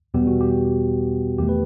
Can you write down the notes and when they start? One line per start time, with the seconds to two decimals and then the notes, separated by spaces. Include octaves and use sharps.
0.14 E2 B2 G3 B3 G4
0.27 F#4
0.41 G4
1.38 E2 D#3 A3 G4
1.49 B4